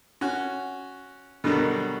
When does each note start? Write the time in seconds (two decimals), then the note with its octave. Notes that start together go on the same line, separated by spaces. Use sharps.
0.21 C#4 F#4
1.44 B2 D3 D#3 F#3 G3